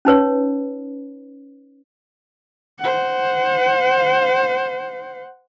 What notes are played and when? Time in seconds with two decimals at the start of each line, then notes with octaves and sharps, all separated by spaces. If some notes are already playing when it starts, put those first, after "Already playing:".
0.05 C#4 D#4 B4 C#5
2.80 C5 F#5